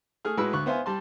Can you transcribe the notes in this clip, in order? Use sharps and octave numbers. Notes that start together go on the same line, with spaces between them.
A3 G#4 F6
A2 G#3 F#4 B4 B5 E6
D2 C#6 F#6
B3 C5 E5 F5 G#5
G3 A5 C6